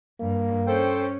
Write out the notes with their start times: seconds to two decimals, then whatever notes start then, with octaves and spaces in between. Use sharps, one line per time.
0.20 G2 A#3
0.67 C#4 A4 C5 G5